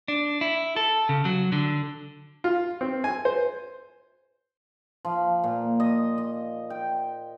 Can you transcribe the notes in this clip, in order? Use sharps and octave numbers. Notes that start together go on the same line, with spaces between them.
D4
E4
A4
C#3
F#3
D3
F4
C4
G#5
C5
F3
A#2
D#5
D#5
G5